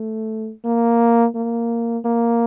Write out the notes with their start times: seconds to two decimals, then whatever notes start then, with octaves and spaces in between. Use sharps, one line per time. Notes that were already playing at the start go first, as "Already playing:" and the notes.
Already playing: A3
0.64 A#3
1.35 A#3
2.05 A#3